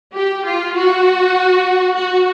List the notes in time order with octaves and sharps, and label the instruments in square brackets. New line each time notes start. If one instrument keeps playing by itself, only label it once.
[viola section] G4
F4
F#4
F#4